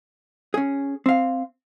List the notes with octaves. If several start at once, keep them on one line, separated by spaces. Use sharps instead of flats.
C#4 G#4
C4 F5